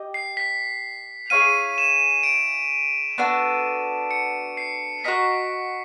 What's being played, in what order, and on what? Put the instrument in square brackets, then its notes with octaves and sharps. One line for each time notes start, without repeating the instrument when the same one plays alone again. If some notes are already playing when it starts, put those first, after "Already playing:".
Already playing: [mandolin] G4 D#5
[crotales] C7
B6
[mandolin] E4 G#4 C#5 F5 [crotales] D#7
[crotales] E7
D7
[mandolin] B3 D4 F#4 A4
[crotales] C#7
C7
[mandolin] F#4 A#4 D#5 [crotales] B6